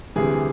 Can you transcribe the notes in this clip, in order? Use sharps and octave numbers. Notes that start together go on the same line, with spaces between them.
D2 C3 E3 G3 G#4